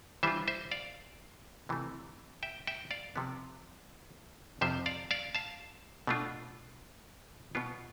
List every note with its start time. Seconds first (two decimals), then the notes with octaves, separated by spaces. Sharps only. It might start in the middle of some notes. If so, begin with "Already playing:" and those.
0.23 E3 G3 D4 F4 C5 E5
0.48 C5 E5
0.72 D5 F5
1.69 C3 E3 A3
2.43 E5 G5
2.67 E5 G5
2.91 D5 F5
3.16 C3 F3 B3
4.61 F2 C3 F3 C5 E5
4.86 D5 F5
5.11 D5 F5
5.35 F5 A5
6.07 B2 A3 D4 F4
7.55 B2 B3 F4